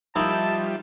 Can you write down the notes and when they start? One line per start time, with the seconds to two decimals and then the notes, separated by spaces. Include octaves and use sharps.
0.16 F3 G3 A#3 D#4 E4 G5 A5